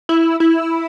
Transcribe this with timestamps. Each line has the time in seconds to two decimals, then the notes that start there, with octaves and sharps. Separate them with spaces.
0.09 E4
0.40 E4